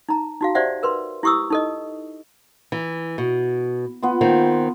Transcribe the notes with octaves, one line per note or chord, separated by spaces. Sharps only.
D#4 A#5
D#4 F#4 F5
G4 C5 D5 E5 F#5
A#4 B4 C6
E4 G4 C#6 D#6 E6
D#4 A4 D#5
E3 A#5
B2
B3 F4
D#3 A#3 C4